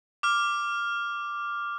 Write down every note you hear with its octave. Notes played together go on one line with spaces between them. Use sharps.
D6 F6